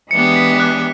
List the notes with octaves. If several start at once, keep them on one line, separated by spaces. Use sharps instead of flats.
E3 G#3 B3 D4 G4 C#7
B6
F#6